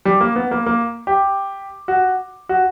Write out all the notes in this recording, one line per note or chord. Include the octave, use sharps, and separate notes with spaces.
G3
A#3
B3
A#3
A#3
G4
F#4
F#4